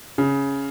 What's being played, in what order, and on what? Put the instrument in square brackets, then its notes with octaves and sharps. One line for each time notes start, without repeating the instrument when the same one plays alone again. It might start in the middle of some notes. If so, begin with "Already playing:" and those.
[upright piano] C#3